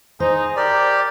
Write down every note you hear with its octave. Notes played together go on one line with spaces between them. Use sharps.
D#4 G#4 C5
G4 A#4 D5